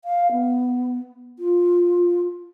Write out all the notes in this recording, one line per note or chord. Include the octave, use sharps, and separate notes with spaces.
F5
B3
F4